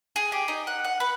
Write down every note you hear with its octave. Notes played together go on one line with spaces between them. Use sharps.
G#4
G4
D#4
F#5
F#5
B4